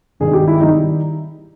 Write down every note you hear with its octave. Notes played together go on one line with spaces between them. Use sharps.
G#1 G2 D#3 G3 G#4
G4
E4
D#3 G3 D#4